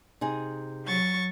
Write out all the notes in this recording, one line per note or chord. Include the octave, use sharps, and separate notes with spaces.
C3 D#4 G#4
F#3 C#6 A6